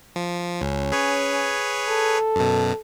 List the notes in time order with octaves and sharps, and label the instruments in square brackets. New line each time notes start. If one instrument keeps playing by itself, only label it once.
[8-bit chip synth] F3
[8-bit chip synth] C#2 [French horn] C#4
[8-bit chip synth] G#4 B4 C#5
[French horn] A4
[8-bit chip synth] F#2 B2